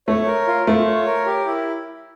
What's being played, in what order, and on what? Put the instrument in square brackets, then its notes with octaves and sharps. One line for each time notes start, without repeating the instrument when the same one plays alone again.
[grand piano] A3 [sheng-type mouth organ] C#5
[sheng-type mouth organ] A#4
F4
[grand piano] A3 [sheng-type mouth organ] F4
[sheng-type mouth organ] C#5
A#4
G4
E4